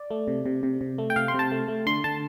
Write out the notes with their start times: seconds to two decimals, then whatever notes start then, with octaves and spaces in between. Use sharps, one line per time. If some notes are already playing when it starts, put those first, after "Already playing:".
Already playing: D5
0.11 A3
0.28 C3
0.46 C3
0.63 C3
0.81 C3
0.98 A3
1.10 G5
1.16 C3 F5
1.28 C6
1.34 C3 A5
1.52 A3
1.68 A3
1.86 D3 C6
2.04 D3 A5